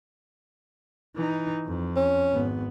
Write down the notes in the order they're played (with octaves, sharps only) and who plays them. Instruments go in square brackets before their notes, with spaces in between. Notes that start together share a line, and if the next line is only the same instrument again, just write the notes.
[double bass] E3 D#4
F2
[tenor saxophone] C#4
[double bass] G#1 B3